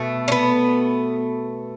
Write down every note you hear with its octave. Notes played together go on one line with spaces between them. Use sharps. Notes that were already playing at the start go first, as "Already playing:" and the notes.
Already playing: B2 A3
C#4
B3